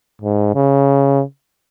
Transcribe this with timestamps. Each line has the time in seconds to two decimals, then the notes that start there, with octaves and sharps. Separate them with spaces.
0.22 G#2
0.55 C#3